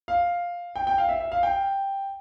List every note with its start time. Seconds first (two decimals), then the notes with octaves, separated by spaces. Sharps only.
0.08 F5
0.76 G5
0.87 G5
0.98 F5
1.09 E5
1.21 E5
1.32 F5
1.43 G5